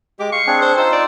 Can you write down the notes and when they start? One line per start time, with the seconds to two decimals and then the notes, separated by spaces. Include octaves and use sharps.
0.20 G#3 G4 D6
0.32 F5 C#6
0.47 C4 D4 G#4
0.62 C5
0.77 D#4 F4 C5 E6
0.93 D5